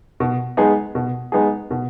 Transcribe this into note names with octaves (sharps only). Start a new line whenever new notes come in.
B2
G#3 B3 D#4 G#4
B2
G#3 B3 D#4 G#4
B2